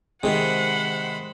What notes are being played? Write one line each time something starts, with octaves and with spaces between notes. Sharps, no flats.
C3 D#3 G#3 C5 F#5 B5